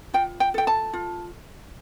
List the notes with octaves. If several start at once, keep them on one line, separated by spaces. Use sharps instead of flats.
F4 G5
G5
A4 G5
A5
F4